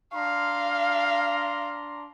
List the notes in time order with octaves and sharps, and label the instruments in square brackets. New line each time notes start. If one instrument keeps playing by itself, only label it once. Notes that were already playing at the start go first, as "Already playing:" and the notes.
[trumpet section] D4 A#5 C6 [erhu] F5